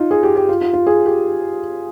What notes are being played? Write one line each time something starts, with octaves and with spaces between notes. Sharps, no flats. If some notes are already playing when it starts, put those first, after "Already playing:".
Already playing: D#4 F4
G#4
G4
G4
F4
F4
F4
G#4
G4